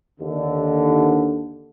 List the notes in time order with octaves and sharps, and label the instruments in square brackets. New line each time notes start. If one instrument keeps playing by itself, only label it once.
[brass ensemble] D#2 D3